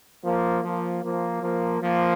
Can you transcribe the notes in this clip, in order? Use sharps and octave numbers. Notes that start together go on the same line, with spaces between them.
F3 A#3
F3 A#3
F3 A#3
F3 A#3
F3 A#3